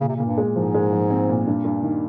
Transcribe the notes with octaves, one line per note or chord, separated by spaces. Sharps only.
A#2 C#3
C3
C#3
A#2
G2
G#3
G#2
F3
G#3
F3
C4
A#2
G2
G2
D#3